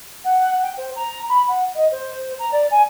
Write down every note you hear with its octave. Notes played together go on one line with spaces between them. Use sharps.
F#5
G5
C5
A#5
B5
F#5
D#5
C5
A#5
D5
G#5